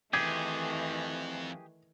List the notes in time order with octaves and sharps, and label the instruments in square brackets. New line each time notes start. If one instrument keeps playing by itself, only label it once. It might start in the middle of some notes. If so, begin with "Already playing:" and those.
[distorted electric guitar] F2 [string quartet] D#3 E3 A3 [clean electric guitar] G4 G#4 [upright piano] G#6